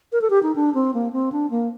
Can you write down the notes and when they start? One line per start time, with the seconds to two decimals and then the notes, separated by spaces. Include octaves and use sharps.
0.12 A#4
0.21 A4
0.30 G4
0.43 D#4
0.56 D4
0.74 C4
0.94 A#3
1.13 C4
1.32 D4
1.51 A#3